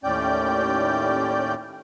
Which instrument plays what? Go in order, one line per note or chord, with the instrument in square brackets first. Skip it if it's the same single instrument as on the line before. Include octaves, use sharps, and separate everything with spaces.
[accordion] D#2 A2 C#4 D5 G5 G6